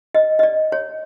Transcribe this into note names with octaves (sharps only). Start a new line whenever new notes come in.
D#5
D#5
D5
C#5